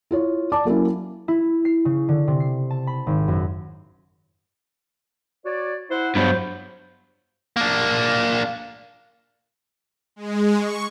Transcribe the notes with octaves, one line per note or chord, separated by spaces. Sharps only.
E4 F4 C#5
D5 A5 D6
F#3 A#3 C#4 E4
E4
C7
C#3
D3
C3
C7
A5
B5
G#1
F#2
F#4 C#5 D5
E4 C5 F#5
G2 F#3 B3 F#4 C5
A#3 D4
G#3
C#6